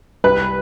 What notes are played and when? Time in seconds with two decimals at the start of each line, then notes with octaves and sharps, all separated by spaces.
0.24 C2 B4